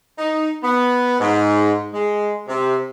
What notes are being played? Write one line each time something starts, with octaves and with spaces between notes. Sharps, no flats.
D#4
B3
G#2
G#3
C3